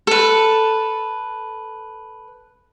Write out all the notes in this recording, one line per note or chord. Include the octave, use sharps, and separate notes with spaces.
A4 B4